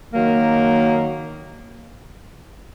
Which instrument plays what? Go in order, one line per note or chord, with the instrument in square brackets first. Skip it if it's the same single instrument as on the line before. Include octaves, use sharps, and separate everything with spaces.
[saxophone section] D#3 F#3 A#3